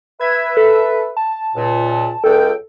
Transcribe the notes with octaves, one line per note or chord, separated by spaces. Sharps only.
B4 E5 G#6
A4
A5
C#2 A#2
C#2 A4 G5